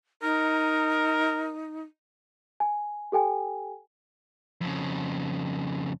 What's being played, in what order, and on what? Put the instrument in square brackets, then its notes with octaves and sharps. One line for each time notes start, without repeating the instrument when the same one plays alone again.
[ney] D#4 [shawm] A#4
[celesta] G#5
G4 A4 G5 G#5
[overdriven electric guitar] F2 C#3